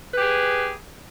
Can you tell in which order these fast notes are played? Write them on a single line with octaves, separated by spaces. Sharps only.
B4 G4 G#4